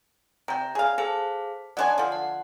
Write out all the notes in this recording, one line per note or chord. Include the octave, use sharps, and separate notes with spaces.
C3 G5 A#5
G#4 F5
G#4 A4 C5 F5
F#3 D4 D5 D#5 G#5 C6
D3 F3
F#5